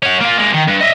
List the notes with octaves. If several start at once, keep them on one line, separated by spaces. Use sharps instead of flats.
C#4 F#4
A#3 F4
G#3 A#3
D#3
G2
D#5 E5